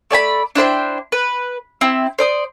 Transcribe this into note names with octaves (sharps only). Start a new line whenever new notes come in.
A3 D5 G#5 B5
D4 E4 C5 G5
B4
C4 E4
C5 D5 D#6